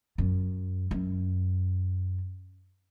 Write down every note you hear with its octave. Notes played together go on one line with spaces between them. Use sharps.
F#2
F#2